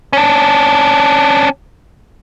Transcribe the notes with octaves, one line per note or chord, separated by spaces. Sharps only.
C#4 D4